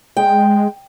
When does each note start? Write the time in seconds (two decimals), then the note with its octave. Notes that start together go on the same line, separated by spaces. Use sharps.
0.17 G#3 G5